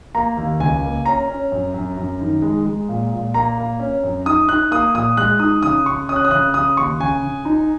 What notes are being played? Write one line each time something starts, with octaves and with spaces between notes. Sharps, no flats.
A#3 A#5
D#2
C#2 G#5
A#3
C#4 A#5
C#4
F#2
F#2
F#2
D#3
G#3
G#3
A#2
A#2
A#3 A#5
A#3
C#4
F#2
D#4 D#6
D#4 F#6
A#3 D#6
A#2 D#6
G#3 F#6
D#4 D#6
C#3 D#6
C#3 C#6
C#4 D#6
F#6
D#6
C#3 F#6
C#3 D#6
D#2 C#6
C#3 G#5
C#3
D#4